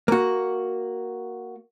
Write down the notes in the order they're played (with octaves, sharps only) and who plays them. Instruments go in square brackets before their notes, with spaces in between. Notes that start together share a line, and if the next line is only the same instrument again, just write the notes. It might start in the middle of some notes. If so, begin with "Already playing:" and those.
[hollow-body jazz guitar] A#3 F#4